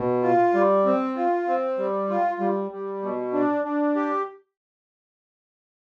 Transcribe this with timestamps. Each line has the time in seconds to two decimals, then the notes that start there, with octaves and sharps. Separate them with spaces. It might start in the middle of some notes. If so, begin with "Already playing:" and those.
Already playing: B2
0.23 F4
0.54 G3
0.86 C4
1.16 F4
1.47 C4
1.78 G3
2.09 F4
2.40 G3
2.71 G3
3.02 B2
3.33 D4
3.65 D4
3.95 G4